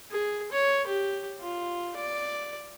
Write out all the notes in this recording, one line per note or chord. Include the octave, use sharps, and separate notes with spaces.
G#4
C#5
G4
F4
D5